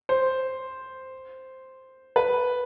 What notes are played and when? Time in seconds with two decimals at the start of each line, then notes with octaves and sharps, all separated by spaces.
0.09 C5
2.16 B4